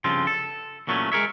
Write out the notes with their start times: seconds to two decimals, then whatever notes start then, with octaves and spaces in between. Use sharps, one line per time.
0.04 G2 C#3 F3 C4 F4
0.27 A4
0.87 E2 A#2 F#3 A3 B3 C#4
1.12 G#3 G#4 A#4 C#5 E5